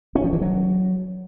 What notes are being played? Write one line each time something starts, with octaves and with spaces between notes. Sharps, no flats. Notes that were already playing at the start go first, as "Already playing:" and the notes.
C#4
F3
E3
F#3